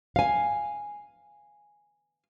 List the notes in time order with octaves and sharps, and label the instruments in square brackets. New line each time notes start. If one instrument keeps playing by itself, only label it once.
[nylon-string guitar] F5 G#5